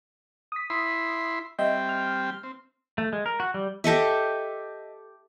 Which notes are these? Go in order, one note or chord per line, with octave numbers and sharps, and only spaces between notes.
D#6 B6
E4 B5 C6
G3 C4 D#5 E5 G5
F6
C4
A3
G#3
A#4
F#4
G3
G4 A4 D#5 E5